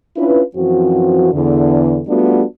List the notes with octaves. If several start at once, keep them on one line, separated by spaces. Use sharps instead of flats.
C#4 D4 E4 F4 B4
F#2 E3 F3 C4 F#4
E2 D3
G3 A3 B3 D4 F4 F#4